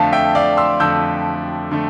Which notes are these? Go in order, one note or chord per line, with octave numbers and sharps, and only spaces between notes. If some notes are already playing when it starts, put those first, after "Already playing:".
Already playing: F2 D3 A3 F5 A5
E5 G5
D5 F5
C6 E6
F2 D3 A3 E6 G6
D3 A3